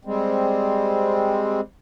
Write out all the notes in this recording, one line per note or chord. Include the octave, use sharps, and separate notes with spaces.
G3 G#3 C4